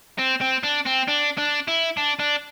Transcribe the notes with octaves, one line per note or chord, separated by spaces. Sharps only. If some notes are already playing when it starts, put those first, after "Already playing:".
C4
C4
D4
C4
D4
D4
E4
D4
D4